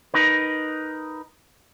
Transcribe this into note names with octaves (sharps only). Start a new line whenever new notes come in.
D#4 A#4 B4